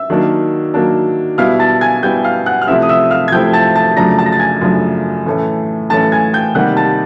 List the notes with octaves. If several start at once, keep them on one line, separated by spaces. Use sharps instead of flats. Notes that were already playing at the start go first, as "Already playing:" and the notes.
Already playing: E5 E6
D#3 F#3 A#3 D4
D#3 F#3 A#3 D4
B2 G3 B3 E4 F5 F6
A5 A6
G#5 G#6
B2 G3 B3 E4 G5 G6
F5 F6
F#5 F#6
F6
C3 F3 A3 C4 E4 E5 E6
D#6
E5 E6
F5 F6
G#6
C3 F3 A3 C4 E4 G5 G6
A5 A6
A5 A6
F#2 C#3 F3 A3 D4 A#5 A#6
A5 A6
A#6
A6
G#5 G#6
F#2 C#3 F3 A3 D4
A2 E3 A3 C#4
A2 E3 A3 C#4 A5 A6
G#5 G#6
G5 G6
C3 D#3 G3 A#3 F#5 F#6
A5 A6